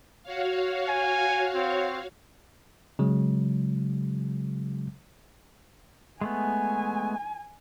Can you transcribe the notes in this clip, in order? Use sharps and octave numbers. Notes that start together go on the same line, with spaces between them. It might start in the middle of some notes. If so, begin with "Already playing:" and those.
F#4 C#5 F5
G#5
C4
C#3 F#3 G#3
G#3 A3 B3 G#5